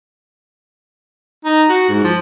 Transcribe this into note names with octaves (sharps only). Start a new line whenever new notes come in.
D#4
F#4
G#2
F3